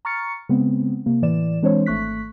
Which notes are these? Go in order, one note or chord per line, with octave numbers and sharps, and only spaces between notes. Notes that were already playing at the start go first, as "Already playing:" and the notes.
A#5 C#6 F6 A6 C#7
C#3 G#3 B3 C4
C3 A#3
A2 E3 D5 E7
E3 G#3 C4 D4 C5 C#5
G#1 A3 C#6 F#6 B6